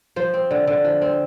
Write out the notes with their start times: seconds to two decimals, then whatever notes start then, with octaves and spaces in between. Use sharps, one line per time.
0.16 F3 C5
0.34 C4
0.51 D3
0.68 D3
0.85 F3
1.02 C4